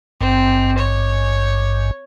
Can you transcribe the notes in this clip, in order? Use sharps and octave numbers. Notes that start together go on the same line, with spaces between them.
G#1 G2 C4
C#5